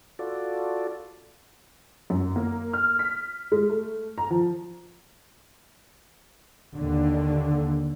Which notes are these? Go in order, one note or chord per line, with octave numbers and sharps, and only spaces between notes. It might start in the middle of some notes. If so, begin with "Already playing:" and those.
F4 F#4 A4 D5
F#2
A#3
F6
B6
G#3
A3
A#5
F3
D#2 D3